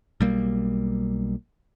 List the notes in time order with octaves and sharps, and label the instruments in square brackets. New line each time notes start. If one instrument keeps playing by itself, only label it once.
[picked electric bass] B1 G3 A#3